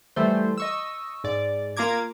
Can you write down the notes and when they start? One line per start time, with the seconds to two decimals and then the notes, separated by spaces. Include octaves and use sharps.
0.16 E3 G3 A3 C5
0.58 D#5 C#6 E6
1.24 G#2 D5
1.77 A#3 F4 A#5 D6 G#6